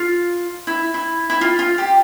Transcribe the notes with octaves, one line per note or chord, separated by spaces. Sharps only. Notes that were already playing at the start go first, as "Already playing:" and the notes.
Already playing: F4
E4
E4
E4
F4
F4
G4